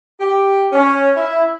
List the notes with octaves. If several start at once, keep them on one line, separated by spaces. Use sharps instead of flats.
G4
C#4
E4